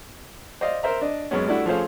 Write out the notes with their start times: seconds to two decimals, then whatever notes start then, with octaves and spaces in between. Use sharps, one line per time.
0.61 C5 D5 D#5 F5
0.83 A#4 C5 E5 A#5
1.01 D4 D#5
1.31 F#2 G#3 B3 C#4
1.46 G3 A3 D4 E4 F#4
1.66 F3 A3 C#4 G#4 C5 F5